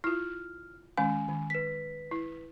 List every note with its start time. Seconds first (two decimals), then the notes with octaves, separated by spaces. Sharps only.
0.04 E4 F4 F6
0.98 D#3 G#3 C#4 G#5
1.28 D#3
1.50 B4 B6
2.11 E4